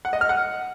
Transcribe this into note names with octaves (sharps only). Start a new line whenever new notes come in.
F#5
D#5
F6
F#5